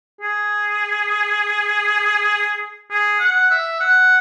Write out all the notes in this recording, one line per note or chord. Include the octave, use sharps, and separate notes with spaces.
G#4
G#4
F#5
E5
F#5